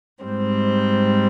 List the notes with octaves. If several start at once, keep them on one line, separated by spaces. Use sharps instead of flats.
G#2 G3 C4